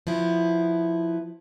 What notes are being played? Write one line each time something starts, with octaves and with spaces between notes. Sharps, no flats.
F3 B3 E4